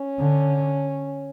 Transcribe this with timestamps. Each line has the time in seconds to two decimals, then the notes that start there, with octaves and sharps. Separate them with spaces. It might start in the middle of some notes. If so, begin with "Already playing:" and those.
Already playing: C#4
0.18 D3